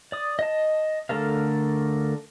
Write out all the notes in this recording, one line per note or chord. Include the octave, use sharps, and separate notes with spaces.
D5 D#6
D#5 A5
D3 A3 A4 A#4 F5